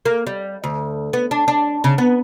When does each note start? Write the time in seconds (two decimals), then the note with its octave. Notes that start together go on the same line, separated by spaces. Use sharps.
0.05 A#3
0.27 G3
0.64 D2
1.13 B3
1.31 D4
1.48 D4
1.84 C#3
1.98 B3